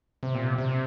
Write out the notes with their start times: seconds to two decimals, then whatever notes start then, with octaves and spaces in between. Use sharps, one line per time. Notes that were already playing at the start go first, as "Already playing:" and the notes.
0.23 C3
0.35 A#2
0.46 C3
0.58 C3